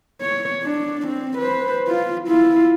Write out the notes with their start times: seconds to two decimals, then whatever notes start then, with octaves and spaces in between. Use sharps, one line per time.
0.21 C#5
0.63 D4
1.07 C4
1.38 B4 C5
1.88 F4
2.28 E4 F4